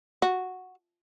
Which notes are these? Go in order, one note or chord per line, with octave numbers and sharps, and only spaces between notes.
F#4